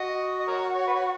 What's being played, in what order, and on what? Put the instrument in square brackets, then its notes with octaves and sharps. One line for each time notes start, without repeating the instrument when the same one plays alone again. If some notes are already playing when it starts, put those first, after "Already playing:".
Already playing: [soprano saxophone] F#4 [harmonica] D#5
[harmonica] D#5
A#4 C#5
C#5
B4
C#5